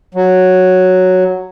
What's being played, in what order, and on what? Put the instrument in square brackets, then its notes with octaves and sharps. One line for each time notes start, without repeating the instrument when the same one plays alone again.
[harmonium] F#3